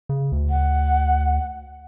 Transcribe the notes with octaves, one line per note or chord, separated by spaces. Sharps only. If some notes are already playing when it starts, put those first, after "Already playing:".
C#3
D2
F#5